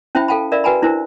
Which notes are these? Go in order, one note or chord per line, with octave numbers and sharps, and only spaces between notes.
C#4 E4 C5 E5 G5 B5
A4 F5 G5 A5 B5
A#4 D5 E5 F5 B5
F#4 B4 G5 G#5 A#5 B5
D4 E4 A#4 C5